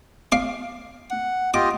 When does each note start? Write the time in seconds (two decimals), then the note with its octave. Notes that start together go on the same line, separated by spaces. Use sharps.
0.32 F5 D6
1.11 F#5
1.54 F4 G4 D#5 D6